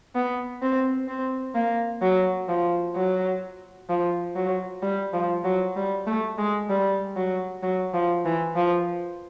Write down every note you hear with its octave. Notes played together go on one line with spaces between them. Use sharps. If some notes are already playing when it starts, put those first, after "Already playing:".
B3
C4
C4
A#3
F#3
F3
F#3
F3
F#3
G3
F3
F#3
G3
A3
G#3
G3
F#3
F#3
F3
E3
F3